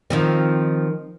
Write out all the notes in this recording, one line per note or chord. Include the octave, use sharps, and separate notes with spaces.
D#3 F3 C4